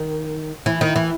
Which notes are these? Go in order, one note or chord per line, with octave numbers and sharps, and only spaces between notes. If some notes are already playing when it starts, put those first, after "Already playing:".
Already playing: D#3
E3
D#3
E3